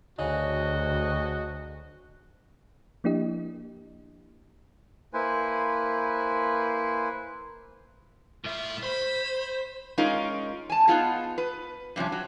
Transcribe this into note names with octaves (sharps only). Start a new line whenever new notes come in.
D2 C#3 F#4 D#5
F3 A#3 D4 E4 G4 D#5
A#3 E4 B4 C5 G#5
A2 G3 F4 E5
C5 B5
G#3 C#4 D#4 F4 A#4
G#5 A5
B3 D#4 F4 G#4
B4
G2 C3 F3 C#4
F#3